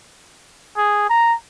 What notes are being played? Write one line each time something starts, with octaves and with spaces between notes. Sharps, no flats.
G#4
A#5